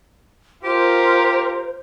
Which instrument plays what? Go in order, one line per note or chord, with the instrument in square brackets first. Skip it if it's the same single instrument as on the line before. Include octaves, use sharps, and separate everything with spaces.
[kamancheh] F4 A#4 [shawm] G4 [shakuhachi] C5